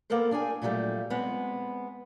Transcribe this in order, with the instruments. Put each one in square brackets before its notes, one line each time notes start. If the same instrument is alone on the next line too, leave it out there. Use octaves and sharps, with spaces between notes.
[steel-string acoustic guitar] A#3 B3 A4 A#4 C5
D4 G#4 G5 G#5
A#2 D3 F#3 G3 A3
G#3 B3 C4 F#5